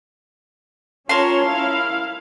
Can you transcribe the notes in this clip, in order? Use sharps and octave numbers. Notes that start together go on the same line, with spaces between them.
C#4 F4 A#4 C#5 A5 C6
E4 F5